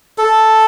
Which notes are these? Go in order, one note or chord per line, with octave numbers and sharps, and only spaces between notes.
A4